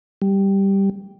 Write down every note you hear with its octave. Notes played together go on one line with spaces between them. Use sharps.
G3